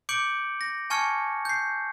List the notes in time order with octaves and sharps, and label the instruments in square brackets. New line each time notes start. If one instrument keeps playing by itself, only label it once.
[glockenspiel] D6 G6 C#7 D7 F#7
A#6
G#5 A5 C#6 F6 G#6 C#7
G6 C7